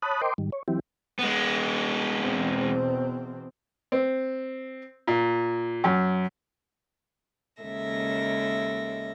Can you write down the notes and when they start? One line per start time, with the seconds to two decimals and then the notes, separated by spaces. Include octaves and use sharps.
0.02 C#5 A5 B5 D#6 F#6
0.22 A#4 C5 D#5 G5 C6 D6
0.38 G#2 D#3 G3
0.52 C#5
0.68 E3 F#3 C4 E4 G4
1.19 G#3 B3
2.18 E2 B2 C4
3.92 C4
5.07 A#2
5.84 F#2
7.61 D#2 C#3 G#3 A4 E5 A#6